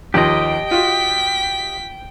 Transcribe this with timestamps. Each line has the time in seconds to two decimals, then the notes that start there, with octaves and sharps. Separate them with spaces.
0.14 D#2 D#3 F3 G4 D#5 G5
0.71 F4 F#4 B6